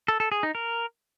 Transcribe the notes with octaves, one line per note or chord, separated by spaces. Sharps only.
A4
A4
G#4
D#4
A#4